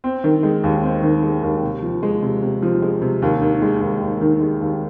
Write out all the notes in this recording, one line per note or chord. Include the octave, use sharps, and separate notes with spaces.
C4
D#3
G#3
D#2
C4
D#3
G#3
D#2
C3
F3
G#3
C3
C3
F3
G#3
C3
D#2
D#3
G#3
D#2
D#2
D#3
G#3
D#2